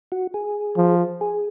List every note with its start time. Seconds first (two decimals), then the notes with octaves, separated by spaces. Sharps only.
0.12 F#4
0.34 G#4
0.77 F3
1.21 G#4